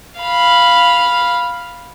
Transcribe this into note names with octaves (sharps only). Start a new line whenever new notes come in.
F5 B5